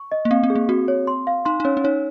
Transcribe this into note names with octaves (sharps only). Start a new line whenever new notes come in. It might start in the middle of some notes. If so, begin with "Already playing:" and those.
Already playing: C#6
D#5
A#3
C4 F5
C4
G#4
A#3
C4 F#4
C#5
C6
F5
D#4 C6
D#4
C#4 C#5
C#4
D#4 C#5